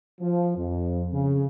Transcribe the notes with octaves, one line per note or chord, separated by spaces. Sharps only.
F3
F2
C#3